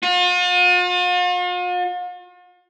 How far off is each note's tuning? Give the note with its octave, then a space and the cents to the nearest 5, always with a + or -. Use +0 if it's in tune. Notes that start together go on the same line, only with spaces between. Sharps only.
F4 +45